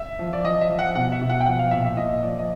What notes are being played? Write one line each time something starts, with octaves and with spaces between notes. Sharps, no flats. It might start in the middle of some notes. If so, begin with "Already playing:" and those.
Already playing: E5
F3
D5
F3 D#5
E5
F3
F#5
B2 F#5
E5
B2
F#5
G5
F3 F#5
F5
A#2 E5
E5
A#2 D#5
F3 D5
D#5